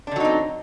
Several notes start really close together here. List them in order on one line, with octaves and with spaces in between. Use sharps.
D4 D3 F#3 D#4 C4